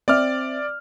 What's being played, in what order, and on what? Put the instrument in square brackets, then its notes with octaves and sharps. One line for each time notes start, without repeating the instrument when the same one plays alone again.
[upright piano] C4 E5 [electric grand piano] D5 D6 F6